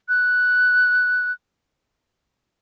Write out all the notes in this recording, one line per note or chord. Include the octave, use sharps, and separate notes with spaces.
F#6